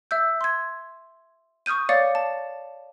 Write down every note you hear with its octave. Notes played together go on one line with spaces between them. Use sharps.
E5 E6 G6
C6 G#6
C#6 D#6 F6 G6 D#7
C#5 D5 F5 D6 A6 C#7
A5